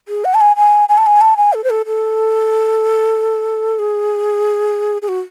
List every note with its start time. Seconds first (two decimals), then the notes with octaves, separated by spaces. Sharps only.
0.08 G#4
0.25 F#5
0.34 A5
0.41 G#5
0.57 G#5
0.89 G#5
0.98 A5
1.06 G#5
1.21 A5
1.37 G#5
1.53 A4
1.64 C5
1.70 A4
1.86 A4
3.79 G#4
5.02 G#4
5.08 F#4